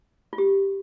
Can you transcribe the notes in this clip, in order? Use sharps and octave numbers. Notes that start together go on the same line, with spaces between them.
F4
G4